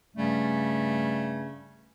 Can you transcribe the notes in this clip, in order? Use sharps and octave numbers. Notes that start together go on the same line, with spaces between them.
G2 C#3 G3 A3 C#4